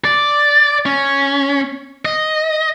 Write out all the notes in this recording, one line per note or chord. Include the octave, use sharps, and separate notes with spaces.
D5
C#4
D#5